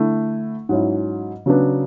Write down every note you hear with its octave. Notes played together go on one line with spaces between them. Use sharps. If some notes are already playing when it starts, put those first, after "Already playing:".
Already playing: D3 A3 E4
G#2 F#3 C#4 E4
C#3 F#3 B3 D4